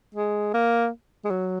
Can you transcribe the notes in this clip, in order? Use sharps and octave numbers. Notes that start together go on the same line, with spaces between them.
G#3
A#3
G#3
F#3